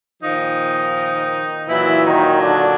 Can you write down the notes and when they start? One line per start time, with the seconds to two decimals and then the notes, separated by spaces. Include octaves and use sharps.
0.23 A#2 D#3 F3 D#4
1.68 A#2 E3 F#3 E4
2.05 D#3 D#4
2.41 D3 D4